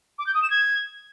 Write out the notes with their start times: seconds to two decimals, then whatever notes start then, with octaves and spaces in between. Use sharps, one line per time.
0.18 D6
0.26 G6
0.34 D#6
0.42 E7
0.50 G#6